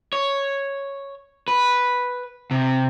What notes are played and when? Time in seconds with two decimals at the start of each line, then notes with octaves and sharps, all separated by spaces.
0.13 C#5
1.48 B4
2.51 C3